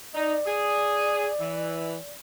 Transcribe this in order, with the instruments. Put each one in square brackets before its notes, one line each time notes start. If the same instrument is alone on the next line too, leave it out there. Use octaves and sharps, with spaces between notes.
[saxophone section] D#4 [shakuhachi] D5
[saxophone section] G#4
E3